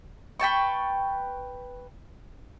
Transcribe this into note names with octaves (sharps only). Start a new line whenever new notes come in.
B4 G5 A5 C#6